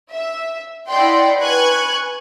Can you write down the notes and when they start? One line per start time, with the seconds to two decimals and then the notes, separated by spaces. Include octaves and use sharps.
0.11 E5
0.88 E4 D5 D#5 F#5 G5 C6
1.39 B4 G#5 C#6 F#6 G#6